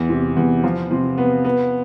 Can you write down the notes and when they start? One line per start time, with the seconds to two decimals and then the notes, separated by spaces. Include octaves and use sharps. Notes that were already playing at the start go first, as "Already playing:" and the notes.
Already playing: E2
0.09 C3
0.36 E2
0.64 F3
0.91 C3
1.18 B3
1.45 B3